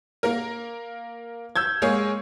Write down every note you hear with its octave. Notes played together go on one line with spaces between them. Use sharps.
A#3 A#4
E6 G6 G#6
G#3 A#3 G#4 C#5